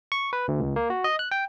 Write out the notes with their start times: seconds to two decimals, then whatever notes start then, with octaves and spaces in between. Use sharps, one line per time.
0.12 C#6
0.33 B4
0.48 D2
0.60 C#2
0.76 A#3
0.90 F#4
1.04 D#5
1.19 F#6
1.32 G5